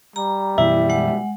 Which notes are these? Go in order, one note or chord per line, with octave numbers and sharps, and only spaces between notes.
G3 A#5
F#2 B2 E3 E4 E5
G#3 F#5